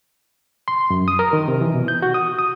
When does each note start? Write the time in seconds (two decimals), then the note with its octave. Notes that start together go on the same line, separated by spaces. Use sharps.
0.68 C6
0.90 F#2
1.08 D#6
1.19 A#4
1.33 D#3
1.48 C3
1.61 E3
1.74 B2
1.88 G6
2.02 F#4
2.14 D#6
2.39 D#6